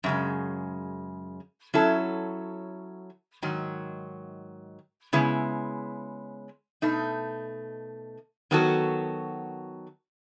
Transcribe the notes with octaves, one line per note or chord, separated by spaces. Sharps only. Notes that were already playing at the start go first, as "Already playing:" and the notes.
F#2 C#3 G#3
F#3 C#4 E4 A4
G#2 D#3 F#3
C#3 G#3 B3 E4
B2 A3 D#4
D#3 F#3 B3 F#4 A4